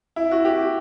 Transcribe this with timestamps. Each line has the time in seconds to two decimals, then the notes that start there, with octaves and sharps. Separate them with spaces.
0.16 E4
0.31 F#4
0.45 G4